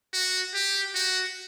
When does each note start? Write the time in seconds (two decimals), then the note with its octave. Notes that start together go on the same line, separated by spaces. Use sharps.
0.13 F#4
0.54 G4
0.95 F#4